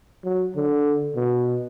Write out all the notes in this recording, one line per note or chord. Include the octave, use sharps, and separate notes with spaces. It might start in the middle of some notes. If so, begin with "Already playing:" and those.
F#3
D3
B2